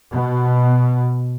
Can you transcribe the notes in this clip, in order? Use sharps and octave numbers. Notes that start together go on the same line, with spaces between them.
B2